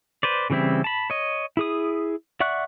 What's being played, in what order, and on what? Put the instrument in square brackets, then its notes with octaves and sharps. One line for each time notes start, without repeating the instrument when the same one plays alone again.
[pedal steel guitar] B4 C5 D5
C#3 E3 G3 C4 E4
A5 B5
C#5 D#5
E4 G#4 D#6
D5 E5 F#5 C#6 F#6